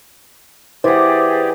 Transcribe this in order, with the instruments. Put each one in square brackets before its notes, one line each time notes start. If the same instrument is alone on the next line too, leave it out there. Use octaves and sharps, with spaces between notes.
[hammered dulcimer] E3 F#5 [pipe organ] G4 G#4 D5 [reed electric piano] C5